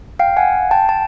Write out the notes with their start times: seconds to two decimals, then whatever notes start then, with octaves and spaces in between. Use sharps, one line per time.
0.19 F5 G5
0.37 F#5 G#5
0.71 G5 A5
0.89 A5